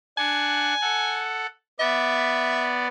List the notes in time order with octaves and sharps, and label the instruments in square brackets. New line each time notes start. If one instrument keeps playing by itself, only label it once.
[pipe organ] D4 F#5 [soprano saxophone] G#5
[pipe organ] A4 F#5
[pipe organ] B3 D5 [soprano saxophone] E5